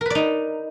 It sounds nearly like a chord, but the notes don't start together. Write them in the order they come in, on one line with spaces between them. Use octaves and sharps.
A#4 B4 D5 D#4